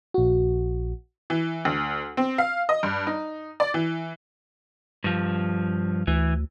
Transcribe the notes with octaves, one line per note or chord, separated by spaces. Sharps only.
A#1 F#4
E3
D2
C4
F5
D#5
G2
D#4
D5
E3
G2 F3
D2 E3